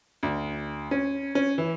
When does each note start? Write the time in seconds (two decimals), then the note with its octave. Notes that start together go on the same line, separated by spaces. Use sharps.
0.23 D2
0.91 C#4
1.35 C#4
1.58 E3